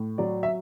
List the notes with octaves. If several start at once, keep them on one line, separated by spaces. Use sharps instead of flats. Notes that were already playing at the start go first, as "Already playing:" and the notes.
Already playing: A2
F#3 D5
E5